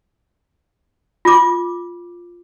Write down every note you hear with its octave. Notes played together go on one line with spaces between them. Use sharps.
F4 D6